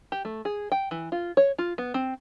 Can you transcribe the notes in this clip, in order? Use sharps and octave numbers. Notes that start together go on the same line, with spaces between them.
G4
A3
G#4
G5
E3
F4
C#5
F4
B3
C4